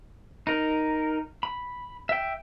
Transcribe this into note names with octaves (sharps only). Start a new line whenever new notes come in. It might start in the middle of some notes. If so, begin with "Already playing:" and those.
D#4 A#4
B5
E5 G5